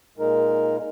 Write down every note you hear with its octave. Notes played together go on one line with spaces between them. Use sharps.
A#2 G#3 D#4 A#4